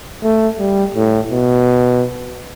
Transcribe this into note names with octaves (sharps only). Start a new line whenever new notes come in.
A3
G3
A2
B2